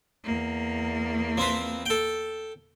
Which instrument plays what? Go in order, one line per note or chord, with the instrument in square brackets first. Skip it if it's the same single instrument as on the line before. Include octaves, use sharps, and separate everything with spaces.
[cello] E2 A#3
[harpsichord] F3 C4 B4
A4 G5